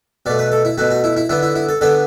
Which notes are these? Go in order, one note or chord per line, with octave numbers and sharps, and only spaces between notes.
B2 A3 D5
B4
A4
E4
B2 A3 F#4
F#4
E4
E4
D3 B3 E4
E4
E4
A4
D3 B3 A4